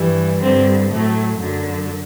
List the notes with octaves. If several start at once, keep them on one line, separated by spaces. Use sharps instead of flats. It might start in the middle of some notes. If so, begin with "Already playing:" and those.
Already playing: G2 E3 G3
G2 D3 G3 C4
A2 F#3 A3
F#2 D3 F#3